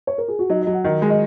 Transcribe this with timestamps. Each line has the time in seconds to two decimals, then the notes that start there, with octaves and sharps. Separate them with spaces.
0.07 C#5
0.18 A#4
0.28 G#4
0.39 F#4
0.50 F#3 D#4
0.62 D#5
0.67 F#3
0.73 F#5
0.84 D#3 D#5
1.02 G#3
1.10 D#5